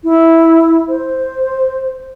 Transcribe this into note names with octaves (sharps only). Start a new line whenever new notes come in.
E4
C5